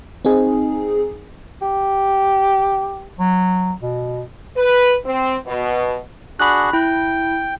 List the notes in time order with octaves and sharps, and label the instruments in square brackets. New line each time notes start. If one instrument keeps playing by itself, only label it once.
[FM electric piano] C4 D#4 G#4
[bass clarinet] G4
F#3
B2
[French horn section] B4
C4
B2
[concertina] D4 F#4 G#4 [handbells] B5 F#6
[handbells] E4 [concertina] G5